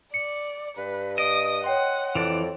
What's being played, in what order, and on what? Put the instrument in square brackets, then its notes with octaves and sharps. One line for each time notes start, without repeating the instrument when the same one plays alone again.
[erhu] D5 [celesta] C#7
[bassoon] G2 [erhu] B4
[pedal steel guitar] D#5 [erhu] D#6 [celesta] D7
[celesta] C#5 G5 C6 [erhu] F#5
[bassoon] F2 [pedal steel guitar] E3 D5